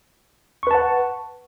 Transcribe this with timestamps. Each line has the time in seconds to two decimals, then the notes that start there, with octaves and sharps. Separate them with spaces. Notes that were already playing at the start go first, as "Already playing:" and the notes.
0.63 C#6
0.67 B4
0.71 A5
0.75 F#5